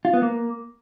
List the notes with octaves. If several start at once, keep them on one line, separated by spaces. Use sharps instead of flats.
F4
B3
A#3